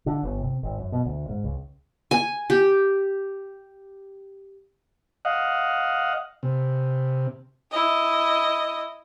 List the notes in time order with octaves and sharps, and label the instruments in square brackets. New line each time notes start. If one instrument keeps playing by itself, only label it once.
[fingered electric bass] D3
G1
C3
G#1
F#2
B2
D2
G#2
C#2
[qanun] G#5
G4
[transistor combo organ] D#5 F5 F#5
C3
[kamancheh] E4 D#5